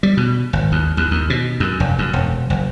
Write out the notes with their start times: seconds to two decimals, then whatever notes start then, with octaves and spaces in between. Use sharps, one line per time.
0.03 G3
0.17 B2
0.53 G#1
0.72 D#2
0.97 D#2
1.11 D#2
1.30 B2
1.60 F#2
1.80 F1
1.99 F#2
2.13 E1
2.50 F#1